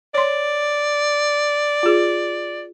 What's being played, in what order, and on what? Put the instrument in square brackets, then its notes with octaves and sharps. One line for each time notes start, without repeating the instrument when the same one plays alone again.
[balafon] C#5 C6 [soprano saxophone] D5
[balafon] F4 G#4